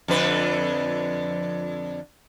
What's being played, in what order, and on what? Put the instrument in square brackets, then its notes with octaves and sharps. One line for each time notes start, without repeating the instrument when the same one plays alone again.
[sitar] F2 D3 B4